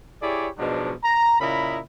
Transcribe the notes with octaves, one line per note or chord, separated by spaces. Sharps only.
E4 G4 G#4 C#5 D5
G#2 B2 F3 F#3 G#3 D4
A#5
A#2 C#3 E4 D#5 A#5 B5